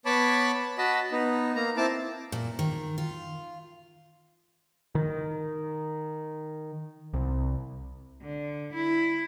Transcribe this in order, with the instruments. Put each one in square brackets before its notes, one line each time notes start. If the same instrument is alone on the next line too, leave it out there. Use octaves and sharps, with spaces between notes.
[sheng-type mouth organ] B3 C#5 A5 B5 D6
F#4 D#5 A5 B5
B3 D#4
A#3 A#5
C4 E4 A5 D6
[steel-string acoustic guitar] A#2
D#3
F4
[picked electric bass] D#3
C2
[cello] D3
E4